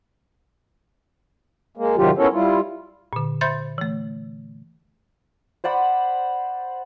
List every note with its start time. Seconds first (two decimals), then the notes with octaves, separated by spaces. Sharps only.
1.77 G#3 A#3
1.96 G#2 C3 D#3 F#3 F4 G4
2.18 B3 C#4 E4 A4 A#4 C#5
2.33 G3 E4 F4
3.13 A#2 D3
3.41 C5 E5 B5 C6 G6 A6
3.78 E3 A3
5.64 C5 D5 F#5 B5